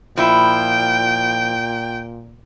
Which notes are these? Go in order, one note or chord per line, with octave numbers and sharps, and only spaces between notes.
A#2 F3 E4 G5